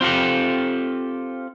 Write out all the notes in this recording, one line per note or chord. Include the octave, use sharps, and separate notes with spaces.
C4 F4 G4 A4